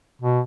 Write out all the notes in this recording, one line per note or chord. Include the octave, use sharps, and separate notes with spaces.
B2